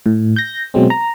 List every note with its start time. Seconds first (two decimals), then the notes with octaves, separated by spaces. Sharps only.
0.06 A2
0.36 G6 A#6
0.74 B2 F#3 G#3 C4
0.90 A#5